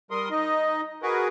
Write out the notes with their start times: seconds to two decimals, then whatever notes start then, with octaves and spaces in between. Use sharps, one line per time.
0.11 G3 A#4 C6 D#6
0.31 D#4 D#5
1.03 F#4 G#4 A#4 B4